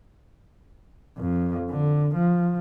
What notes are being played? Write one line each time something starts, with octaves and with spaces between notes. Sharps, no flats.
F2
D3
F3